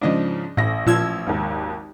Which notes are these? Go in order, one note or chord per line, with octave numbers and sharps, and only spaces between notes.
G#2 C#3 F3 D4 D#5
A1 A2 A#6
A#2 F3 E6 G#6
G#1 D#2